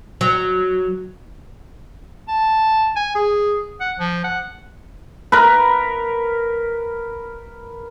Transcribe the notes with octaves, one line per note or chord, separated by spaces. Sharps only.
F#3
A5
G#5
G#4
F#5
F3
F#5
A#4 B4